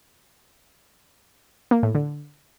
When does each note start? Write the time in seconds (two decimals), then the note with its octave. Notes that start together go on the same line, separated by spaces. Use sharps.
1.71 A#3
1.83 A2
1.95 D3